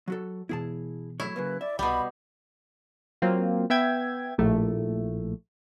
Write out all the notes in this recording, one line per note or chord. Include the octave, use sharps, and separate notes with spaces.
F#3 F#4 A4
B2 E3 B3 E4 G#4 A5
F#3 A3 E4 C#5
C#3 F#3 A#3 B4
D5 E5
C2 B2 G3 B5
F#3 A#3 C4 F4
B3 E5 G5 G#6
A#1 A2 A3